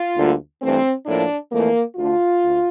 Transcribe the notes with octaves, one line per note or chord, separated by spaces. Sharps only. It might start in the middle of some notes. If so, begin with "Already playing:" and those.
Already playing: F4
D2 D3 G3 A#3
G2 E3 A3 C4
A2 F3 A#3 D4
F2 E3 A3 A#3
D2 D3 A3 F4
D2